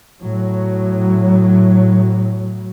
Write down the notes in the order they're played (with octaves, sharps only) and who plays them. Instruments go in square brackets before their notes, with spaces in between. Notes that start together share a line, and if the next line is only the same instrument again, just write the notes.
[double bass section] A2 F#3